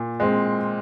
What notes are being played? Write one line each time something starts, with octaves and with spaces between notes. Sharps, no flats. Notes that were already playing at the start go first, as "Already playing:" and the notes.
Already playing: A#2
G#3 C4